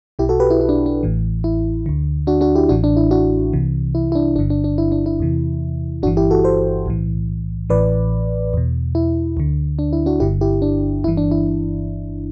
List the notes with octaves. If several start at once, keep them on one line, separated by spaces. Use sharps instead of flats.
B1 B2 E4 G4
F#4 A4
G4 B4
E4
E4
D4
D4
A1 A2 E3
E4
D2 D3
D4 F#4
D4 F#4
E4 G4
A1 A2 E3 D4 F#4
D4
E4
D4 F#4
C2 C3 E3
E4
E4
D4
G1 G2 D3 D4
D4
D4
E4
D4
E4
E2 C3 E3
G1 G2 E3 D4 F#4
E4 G4
F#4 A4
A4 C5
B1 A2 E3
A1 A2 E3 B4 D5
E2 B2
E4
D2 D3
D4
E4
D4 F#4
G1 G2 D3 E4 G4
E4 G4
D4
G1 G2 E3 E4
D4
E4